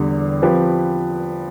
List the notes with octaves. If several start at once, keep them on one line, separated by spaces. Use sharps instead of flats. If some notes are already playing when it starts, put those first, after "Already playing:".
Already playing: E2 D3 G3
F3 C4 G4 B4